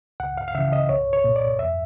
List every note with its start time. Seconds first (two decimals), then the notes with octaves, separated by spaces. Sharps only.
0.20 C#2 F#5
0.38 F5
0.48 F5
0.55 C#3 E3 E5
0.72 D#5
0.89 C2 C#5
1.13 C#5
1.24 A#2
1.36 D5
1.59 F2 E5